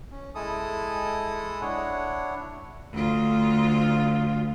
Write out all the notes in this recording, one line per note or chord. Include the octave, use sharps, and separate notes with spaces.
C#4
G#3 E4 A4 D#6
D4 E4 C#5 F#5
D2 F4